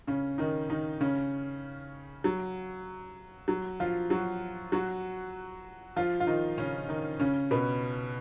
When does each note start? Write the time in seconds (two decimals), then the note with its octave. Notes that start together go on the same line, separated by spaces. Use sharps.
0.07 C#3 C#4
0.38 D#3 D#4
0.70 D#3 D#4
1.01 C#3 C#4
2.24 F#3
3.48 F#3
3.80 F3 F4
4.10 F#3 F#4
4.72 F#3 F#4
5.96 F3 F4
6.20 F4
6.27 D#3 D#4
6.58 C#3 C#4
6.89 D#3 D#4
7.20 C#3 C#4
7.51 B2 B3